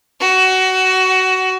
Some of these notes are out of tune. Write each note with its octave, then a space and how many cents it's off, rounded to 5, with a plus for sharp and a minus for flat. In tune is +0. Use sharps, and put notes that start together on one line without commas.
F#4 +20